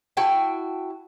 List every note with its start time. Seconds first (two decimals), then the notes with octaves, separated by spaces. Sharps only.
0.17 E4 F#4 G5 A5